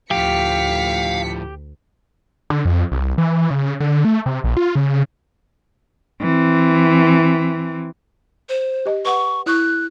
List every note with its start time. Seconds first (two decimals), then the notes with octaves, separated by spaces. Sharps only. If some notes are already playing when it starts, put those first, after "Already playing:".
0.11 D2 A2 F3 G4 F5 B6 C#7
2.50 D3
2.65 F2
2.92 C2
3.18 E3
3.51 C#3
3.80 D3
4.05 A3
4.26 C3
4.44 A#1
4.57 F4
4.76 C#3
6.21 E3 C4
8.49 C5
8.86 G4 D#5
9.05 B4 F#5 C#6
9.46 E4 C#6 F#6